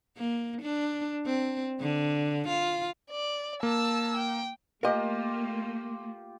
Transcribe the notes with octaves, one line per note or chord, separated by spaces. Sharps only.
A#3
D4
C4
D3
F4
D5
A#3 A5 E6
G5
A3 A#3 F4 G4 A#4 D#5